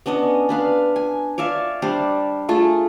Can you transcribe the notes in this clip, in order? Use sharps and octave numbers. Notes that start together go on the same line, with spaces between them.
B3 C#4 D4 D#5
D4 B4 F5
G#5
C#5 D5 E5 F5
G3 D4 C5 F5
A3 F4 G#4 A4